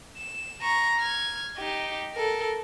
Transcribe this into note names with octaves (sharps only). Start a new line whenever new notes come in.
E7
A#5 C#6
F6 G#6
D#4 G4
A4 A#4